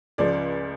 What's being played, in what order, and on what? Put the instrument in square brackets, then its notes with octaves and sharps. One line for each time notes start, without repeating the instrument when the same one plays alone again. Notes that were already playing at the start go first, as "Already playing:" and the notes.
[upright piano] C#2 C#3 F3 D5